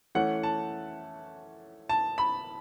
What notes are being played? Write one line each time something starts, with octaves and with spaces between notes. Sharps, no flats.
E3 A3 C#4 F#5
A5
A5
B5